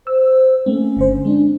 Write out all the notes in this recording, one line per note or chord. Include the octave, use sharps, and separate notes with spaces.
C5 E6
A3 A#3 C4 C#4
G1 D3 C5
G#3 C4 D4